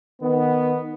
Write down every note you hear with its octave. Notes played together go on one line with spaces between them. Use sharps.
D#3 B3